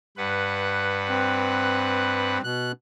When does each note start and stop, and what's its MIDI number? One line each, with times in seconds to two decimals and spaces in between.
0.17 2.38 43
0.17 2.38 71
0.17 2.38 78
1.09 2.42 60
2.44 2.72 47
2.44 2.72 90